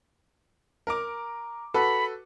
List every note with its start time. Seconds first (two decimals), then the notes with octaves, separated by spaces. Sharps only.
0.87 A#4 A#5 D6
1.74 F#4 A4 B4 B5